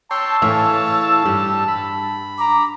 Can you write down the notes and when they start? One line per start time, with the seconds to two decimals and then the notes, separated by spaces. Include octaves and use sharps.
0.11 C#5 G5 A5 C6 E6
0.42 A2 E3 C#5 E5 F5
1.25 G2 G3
1.68 B5
2.38 A#5 D6